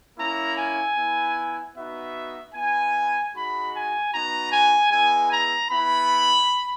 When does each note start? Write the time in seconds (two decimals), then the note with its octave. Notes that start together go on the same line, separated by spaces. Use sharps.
0.17 A#3 C#4 E4 A#5
0.56 G#5
0.96 B3 E4
1.75 B3 D#4 F#4 E5
2.54 B3 E4 G#5
3.33 G#3 D#4 F#4 B5
3.73 G#5
4.13 B3 D#4 F#4 A#5
4.51 G#5
4.91 G#3 B3 E4 G#5
5.31 A#5
5.70 B3 E4 B5